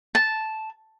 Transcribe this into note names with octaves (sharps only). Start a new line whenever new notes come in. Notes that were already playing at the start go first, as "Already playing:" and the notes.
A5